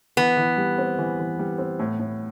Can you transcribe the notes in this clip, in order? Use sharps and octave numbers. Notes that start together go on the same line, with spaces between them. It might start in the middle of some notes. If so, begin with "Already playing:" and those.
E3 B3
E3
G3
C4
E3
E3
G3
C4
A2
A2